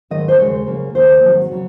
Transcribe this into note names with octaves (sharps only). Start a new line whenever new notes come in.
G#2 D#3 F#3 C4 D#5
C5
D#2 C#3 G#3 C#5
C#3 F#3 A#3
D#2 D#3 A#3 C5
G#2 D#3 F#3 C4
C#3 F#3